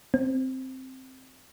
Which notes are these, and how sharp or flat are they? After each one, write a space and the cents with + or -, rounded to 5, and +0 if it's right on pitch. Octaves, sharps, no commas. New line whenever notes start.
C4 +0